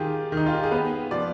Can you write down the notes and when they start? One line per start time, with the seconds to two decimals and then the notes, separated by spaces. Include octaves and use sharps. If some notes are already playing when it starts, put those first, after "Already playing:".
Already playing: D#3 F4 G4 G#4
0.32 D#3
0.37 D#4
0.46 F4
0.54 G4
0.63 G#4
0.71 B3 B4
1.11 F3 D5